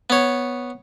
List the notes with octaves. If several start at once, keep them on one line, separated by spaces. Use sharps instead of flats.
B3 C#5